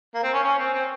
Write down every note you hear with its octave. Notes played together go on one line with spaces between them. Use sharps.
A#3
C4
C#4
C#4
C4
C4